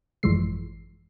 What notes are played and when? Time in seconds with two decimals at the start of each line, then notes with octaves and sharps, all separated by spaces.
0.23 G#1 F#2 E3 F3 G#3 C7